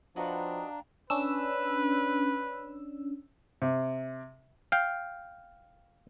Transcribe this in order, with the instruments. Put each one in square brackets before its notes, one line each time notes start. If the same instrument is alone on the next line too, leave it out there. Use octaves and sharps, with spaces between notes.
[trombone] F3 [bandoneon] D4 [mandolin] D#4 F#4 B4 [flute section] F5 G5 A#5
[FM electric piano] C#4 D4 E6 [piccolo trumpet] B4
[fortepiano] C3
[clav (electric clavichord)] F5 G5